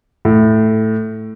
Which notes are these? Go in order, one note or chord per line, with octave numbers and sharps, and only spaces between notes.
A2